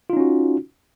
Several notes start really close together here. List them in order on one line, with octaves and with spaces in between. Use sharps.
F4 D#4 C#4 F#4